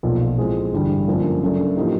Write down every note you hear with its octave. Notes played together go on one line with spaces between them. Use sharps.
B1 A#2 F3
A2 F3 G#3 C4
A1 G2 D3 G3
F#2 D3 F3 A#3
F#2 C#3 F#3 A3 D4
A2 F3 A#3 D#4 G4